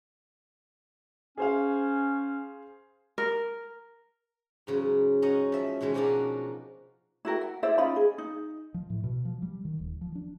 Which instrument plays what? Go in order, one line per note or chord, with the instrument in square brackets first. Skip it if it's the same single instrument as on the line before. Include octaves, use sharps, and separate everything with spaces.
[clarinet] C#4 [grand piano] G#4 C5 F5
[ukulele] A#4
[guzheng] G#2 C#3 F#3
C#4 D#4 D#5 F#5
F3 E5
B2 D#3 G#3 C#4
B2 F3 A#3 D4 D#4 F#4
[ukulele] E4 F#4 A#4 G5
F#5
E4 C5 D5 E5
C#4 D#4 F4 B5
G#4
D#4
[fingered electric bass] F3
A2
B2
F3
G3
D#3
D#1
F3
D4